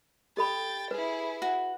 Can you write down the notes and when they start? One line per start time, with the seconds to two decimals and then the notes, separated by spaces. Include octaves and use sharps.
0.37 G4 A4 G5 B5 A6
0.91 E4 G#4 B4
1.42 F#4